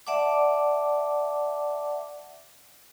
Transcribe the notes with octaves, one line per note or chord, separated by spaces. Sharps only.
D5 E5 F#5 A5 D6